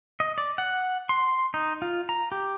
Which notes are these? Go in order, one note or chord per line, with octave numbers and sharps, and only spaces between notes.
D#5
D5
F#5
C6
D#4
F4
A#5
G4